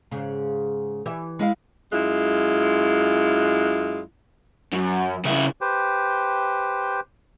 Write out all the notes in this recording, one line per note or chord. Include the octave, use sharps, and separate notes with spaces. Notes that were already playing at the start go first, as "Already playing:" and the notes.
G#2 C#3
E3 G4 E5
G#3 E4 F5
F#2 G#3 E4 F4
F#2
C#3 E4
G4 B4 C5 G5